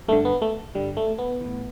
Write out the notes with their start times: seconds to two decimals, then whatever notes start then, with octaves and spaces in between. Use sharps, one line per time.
0.08 G2 D3 A3
0.25 B3
0.42 A3
0.75 G2 D3 G3
0.97 A3
1.18 B3
1.41 A2 E3